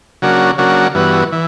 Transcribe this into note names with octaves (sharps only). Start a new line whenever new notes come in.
C#3 F#3 A#3 D4 F#4
C#3 F#3 A#3 D4 F#4
G2 E3 B3 F#4
E3